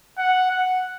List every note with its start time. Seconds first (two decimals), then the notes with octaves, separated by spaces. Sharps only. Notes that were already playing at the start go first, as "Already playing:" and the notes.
0.18 F#5
0.51 F#5